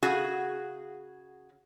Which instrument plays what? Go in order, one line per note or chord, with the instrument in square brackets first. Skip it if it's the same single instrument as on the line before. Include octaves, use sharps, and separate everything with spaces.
[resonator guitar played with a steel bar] C#3 F#4 G#4